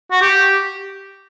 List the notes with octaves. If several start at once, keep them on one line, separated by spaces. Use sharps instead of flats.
F#4
G4